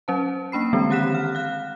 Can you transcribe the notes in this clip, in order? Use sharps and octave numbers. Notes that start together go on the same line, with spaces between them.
F#3 C#4 C5 A5
A#3 D4 B5 C7
D3 E3 G3 G#3 C4 D4
D#3 G4 F#5 F#6 B6 E7
F6
F5 F#6